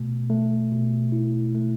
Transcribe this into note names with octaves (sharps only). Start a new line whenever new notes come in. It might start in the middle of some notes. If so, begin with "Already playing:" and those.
Already playing: B2 A3
A3
B2
E4
A3